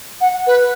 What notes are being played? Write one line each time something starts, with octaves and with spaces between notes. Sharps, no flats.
F#5
B4